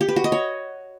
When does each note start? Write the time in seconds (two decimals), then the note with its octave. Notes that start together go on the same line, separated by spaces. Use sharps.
0.01 G4
0.08 B4
0.16 F#4
0.24 D#5
0.32 C#5